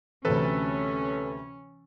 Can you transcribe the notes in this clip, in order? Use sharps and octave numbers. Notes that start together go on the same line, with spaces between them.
D2 C3 E3 C#4 A4 B4